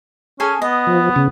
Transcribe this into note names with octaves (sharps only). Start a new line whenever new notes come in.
C#4 G#4 A4 G#5
B3 D#5
F3
C#3